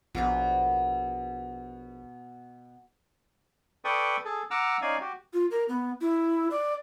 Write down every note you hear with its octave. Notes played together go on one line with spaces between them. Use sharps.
A#1 B2 B3 B4
A4 B4 D5 G5 C#6 D#6
G#4 A4
F#5 A#5 D6 E6 F6
C#4 D#4 D5 F5 G#5
F#4 G4
F4
A#4
B3
E4
D5